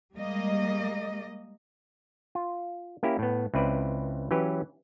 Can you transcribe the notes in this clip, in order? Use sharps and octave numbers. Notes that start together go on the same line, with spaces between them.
G3 G#3 A#3 D#5
F4
A#3 C#4 E4 G4
A2 B3
C#2 C4 E4 B4 D5
E3 F#3 C#4 G4 B4